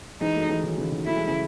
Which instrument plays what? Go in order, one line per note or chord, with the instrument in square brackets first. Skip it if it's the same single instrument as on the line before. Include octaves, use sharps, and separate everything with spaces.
[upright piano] E3 G#3 [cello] D#4
[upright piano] F#3 A3
E3 G#3
D#3 F#3
C#3 E3
D#3 F#3
[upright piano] F#3 A3 [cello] E4
[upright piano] E3 G#3
C#3 E3